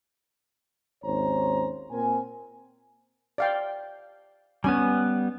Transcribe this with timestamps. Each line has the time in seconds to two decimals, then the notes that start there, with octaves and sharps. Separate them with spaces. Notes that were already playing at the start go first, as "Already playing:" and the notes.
1.04 G#1 D#2 C#4 C5 C#5 A#5
1.91 A#2 C4 A#4 G#5
3.38 D5 F5 G5
4.64 G3 B3 C#4 G#5